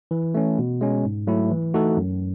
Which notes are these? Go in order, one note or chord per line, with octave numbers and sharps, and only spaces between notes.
E3
A3 C#4
B2
G#3 C#4
G#2
F#3 A3 E4
E3
A3 D#4 F#4 A4
F#2